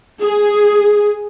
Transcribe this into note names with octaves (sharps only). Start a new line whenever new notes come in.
G#4